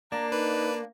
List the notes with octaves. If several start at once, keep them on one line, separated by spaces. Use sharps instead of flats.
A#3 D4 A#5
D#4 B4